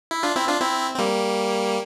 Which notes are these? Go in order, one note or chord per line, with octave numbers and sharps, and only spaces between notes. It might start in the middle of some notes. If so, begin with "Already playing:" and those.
E4
D4 F4
C4 E4
D4 F4
C4 E4
C4
G3 A#3